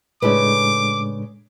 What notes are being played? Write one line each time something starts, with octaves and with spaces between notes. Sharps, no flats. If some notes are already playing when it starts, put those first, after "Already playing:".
A2 C#3 G#3 D4 A4 B4 D6